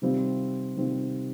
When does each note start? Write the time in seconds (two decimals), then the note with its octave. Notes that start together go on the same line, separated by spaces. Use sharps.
0.02 C3 D#3 G3 C4 F4
0.76 C3 D#3 G3 C4 F4